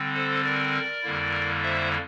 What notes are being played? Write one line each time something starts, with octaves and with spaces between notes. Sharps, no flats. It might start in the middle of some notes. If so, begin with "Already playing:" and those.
Already playing: D3 G3 C4
A4 C5
A#4 D5
F2 D3 G3 A#3 E4
C5 E5